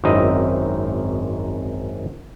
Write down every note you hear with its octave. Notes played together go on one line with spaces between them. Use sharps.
G#1 F#2 C4 D#4 E4 D#5